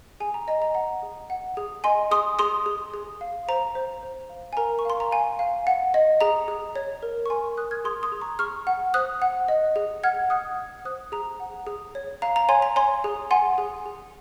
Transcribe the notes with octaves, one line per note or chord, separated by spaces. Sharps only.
G#4 G#5
A#5
D#5 A#5
A#5
F#5 A#5
G#4
F#5
G#4
D#5 G#5 C6
G#4 C6 D#6
G#4 C6 D#6
G#4
G#4
F5
C5 A#5
C5
C5
F5
G#5
A#4 A#5
C#6
F5 C6
A#5
F5 G#5
F5
F#5
D#5
G#4 A#5
G#4
C#5
A#4
C#6
A#4 G#5 C6
A#4 D#6 F#6
F6 G#6
G#4 C6 D#6
C6 D#6
G#4
A#5 C#6
G#4 C#6 F6
F#5
C5 D#6 F#6
F#5
D#5
G#4
F#5 F6 G#6
F#5 D#6 F#6
F#5
C5 D#6 F#6
G#4 A#5
F#5
G#4
C#5
F5 A#5
A#5
C#5 G#5 C6
A#5
C#5 G#5 C6
G#4
F#5 G#5 C6
G#4
G#4